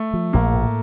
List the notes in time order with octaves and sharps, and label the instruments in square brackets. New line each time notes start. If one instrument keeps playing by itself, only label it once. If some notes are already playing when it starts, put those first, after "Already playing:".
Already playing: [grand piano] A3
[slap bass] F3
[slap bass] A#1 [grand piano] A#3
[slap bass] A2